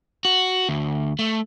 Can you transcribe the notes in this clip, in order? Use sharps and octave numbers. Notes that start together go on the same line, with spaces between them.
F#4
D2
A3